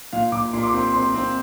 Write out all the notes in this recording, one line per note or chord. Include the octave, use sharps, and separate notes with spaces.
A#2 F5
A#2 D6
A#2 C6
D6
C4 C6
C4 C6
C4